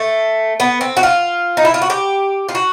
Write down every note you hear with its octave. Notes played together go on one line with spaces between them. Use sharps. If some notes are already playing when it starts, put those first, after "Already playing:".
Already playing: A3
B3
C4
F#4
F4
D#4
E4
F4
F#4
G4
F4
F#4